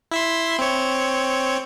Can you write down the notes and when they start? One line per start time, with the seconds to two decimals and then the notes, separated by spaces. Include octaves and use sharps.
0.11 E4 E5 C6
0.59 C4 C#5